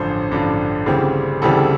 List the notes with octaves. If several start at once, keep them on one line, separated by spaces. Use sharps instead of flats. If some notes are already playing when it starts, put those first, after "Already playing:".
Already playing: A1 G2 D3 F3 C5
A1 G2 D3 F3
D2 C#3 E3 G3 C4
D2 C#3 E3 G3 C4 A4